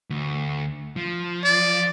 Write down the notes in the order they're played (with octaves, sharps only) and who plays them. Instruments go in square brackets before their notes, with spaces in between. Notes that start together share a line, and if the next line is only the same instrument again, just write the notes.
[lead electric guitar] D2
F3
[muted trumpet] D5